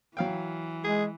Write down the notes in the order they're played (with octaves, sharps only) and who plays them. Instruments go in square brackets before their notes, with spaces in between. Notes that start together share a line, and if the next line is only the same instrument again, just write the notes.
[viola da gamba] E3 [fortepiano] F#3 F5 G5
[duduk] G#3 [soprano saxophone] G#4